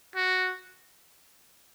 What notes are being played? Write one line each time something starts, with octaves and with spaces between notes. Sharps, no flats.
F#4